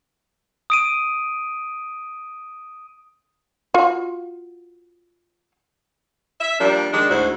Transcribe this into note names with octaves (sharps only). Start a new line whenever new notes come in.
D#6 D7 D#7
F4 F#4
E5
F3 G3 A#3 D4
D#3 G#3 D4
D2 G#2 E4 F#4 C5